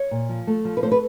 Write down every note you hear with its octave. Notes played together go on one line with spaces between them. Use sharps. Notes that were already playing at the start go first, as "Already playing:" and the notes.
Already playing: C#5
A#2
F3
A3
F3
B4
A3 C5
B4